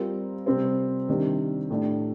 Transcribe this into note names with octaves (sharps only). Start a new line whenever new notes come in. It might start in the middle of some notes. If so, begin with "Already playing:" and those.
Already playing: G3 C4 F4 A#4
C3 G3 C4 G4 C5
C3 D#3 G3 D4 G4
A2 A3 D4 G4